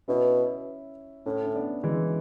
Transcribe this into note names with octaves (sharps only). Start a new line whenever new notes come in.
B2 C#4 E4
A2 C#4 E4
C#4
B3 D4
E3 G#3